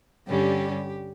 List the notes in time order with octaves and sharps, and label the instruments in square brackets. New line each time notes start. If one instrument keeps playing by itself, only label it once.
[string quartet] G2 D3 G3 C#4 G4